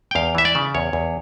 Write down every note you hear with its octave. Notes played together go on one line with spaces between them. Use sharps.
G5
E2 F5
E3 E5
D5
C#3
E2 C#5
E2